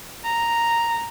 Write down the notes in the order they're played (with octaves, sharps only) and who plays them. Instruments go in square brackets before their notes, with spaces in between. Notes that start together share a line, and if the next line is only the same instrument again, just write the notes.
[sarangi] A#5